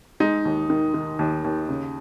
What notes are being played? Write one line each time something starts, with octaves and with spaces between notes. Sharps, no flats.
G#3 D#4
D#2
D#3
D#3
D#2
D#2
C#3